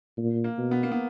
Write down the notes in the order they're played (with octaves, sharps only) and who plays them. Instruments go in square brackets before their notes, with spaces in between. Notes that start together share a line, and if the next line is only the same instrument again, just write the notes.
[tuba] A#2
[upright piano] A#3
[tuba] B2
[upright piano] B3
A#3
B3